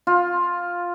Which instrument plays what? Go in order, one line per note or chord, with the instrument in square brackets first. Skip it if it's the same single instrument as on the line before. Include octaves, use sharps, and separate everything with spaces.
[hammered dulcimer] F4